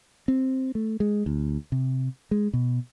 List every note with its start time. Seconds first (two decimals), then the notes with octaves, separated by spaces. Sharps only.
0.28 C4
0.75 A3
1.00 G#3
1.26 D2
1.72 C3
2.31 G#3
2.53 B2